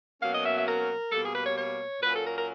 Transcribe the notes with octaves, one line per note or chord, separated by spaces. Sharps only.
B2 F#3 A#3 C#4 F5
D#5
E5
E5
A#4
B2 G3 A#3 A4
G#4
B4
C#5
C#5
A#2 F#3 A#3 C#4 B4
A4
A#4
A#4